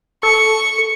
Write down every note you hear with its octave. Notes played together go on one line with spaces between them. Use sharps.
A4 C#6